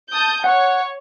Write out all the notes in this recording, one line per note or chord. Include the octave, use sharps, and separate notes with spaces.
A5 D#6 G6
C#5 F#5